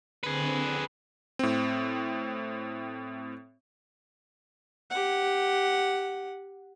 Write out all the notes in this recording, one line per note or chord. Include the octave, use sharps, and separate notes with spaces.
D3 C4 G#4 B4
A2 C4
G4 F#5